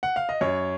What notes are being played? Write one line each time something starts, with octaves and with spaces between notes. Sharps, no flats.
F#5
F5
D#5
F#2 C#5